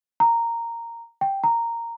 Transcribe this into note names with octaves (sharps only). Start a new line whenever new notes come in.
A#5
G5
A#5